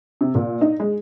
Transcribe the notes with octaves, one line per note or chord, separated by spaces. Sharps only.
C3
A#2
D#4
G#3